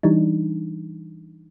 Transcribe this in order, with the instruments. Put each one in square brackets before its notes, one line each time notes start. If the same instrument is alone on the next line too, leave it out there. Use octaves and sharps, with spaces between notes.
[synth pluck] E3 G3 D4 D#4